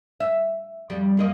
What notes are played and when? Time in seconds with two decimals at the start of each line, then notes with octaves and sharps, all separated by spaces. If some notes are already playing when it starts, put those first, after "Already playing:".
0.20 E5
0.90 F2 G3
1.17 F#2 A#3 D#5